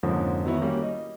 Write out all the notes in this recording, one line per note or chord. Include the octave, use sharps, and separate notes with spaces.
F2 G#2 D3 F3 A#3 C#4
D#3 F#3 B3 E4
G3 A#3 C#4 F#4
D#5